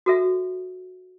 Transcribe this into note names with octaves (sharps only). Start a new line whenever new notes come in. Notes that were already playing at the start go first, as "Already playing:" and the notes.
F#4 A4 E5